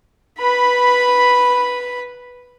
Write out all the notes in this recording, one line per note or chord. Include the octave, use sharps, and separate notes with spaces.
B4 B5